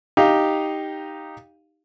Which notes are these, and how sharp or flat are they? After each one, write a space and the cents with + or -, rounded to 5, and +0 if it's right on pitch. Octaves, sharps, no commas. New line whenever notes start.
D#4 +0 G4 +0 F5 +0